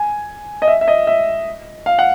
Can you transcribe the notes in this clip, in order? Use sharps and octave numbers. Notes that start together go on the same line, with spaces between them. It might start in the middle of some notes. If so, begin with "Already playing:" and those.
Already playing: G#5
D#5
E5
E5
D#5
E5
F5
F#5